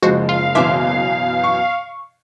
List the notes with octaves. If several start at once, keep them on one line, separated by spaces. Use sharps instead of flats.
F#1 F3 G#3 F#4 C5
F4 F5
F#2 B2 E3 E5 C6 D6
C#6